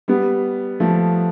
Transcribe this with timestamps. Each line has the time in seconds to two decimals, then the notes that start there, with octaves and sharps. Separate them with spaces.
0.08 G3 B3
0.80 F3 A3